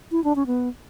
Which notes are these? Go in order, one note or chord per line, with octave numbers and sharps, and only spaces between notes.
E4
D4
C#4
B3